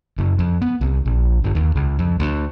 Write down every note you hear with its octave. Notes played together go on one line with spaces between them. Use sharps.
F#1
F2
B3
C2
A#1
G1
D#2
C#2
F2
D2